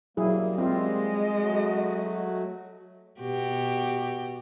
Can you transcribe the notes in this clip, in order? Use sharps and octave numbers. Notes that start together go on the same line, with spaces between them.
F#3 G3 A#3 E4 G#4
G#3 C4 F4 D#5
F#3 A3 F#4
B2 F#4 G4